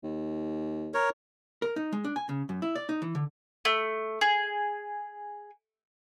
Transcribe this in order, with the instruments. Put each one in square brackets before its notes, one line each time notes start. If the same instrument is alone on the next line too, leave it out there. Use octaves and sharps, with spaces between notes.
[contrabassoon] D#2
[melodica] A#4 C#5
[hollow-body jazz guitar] A#4
D#4
G#3
D4
G#5
C#3
F#2
E4
D5
D#4
E3
D3
[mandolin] A3
G#4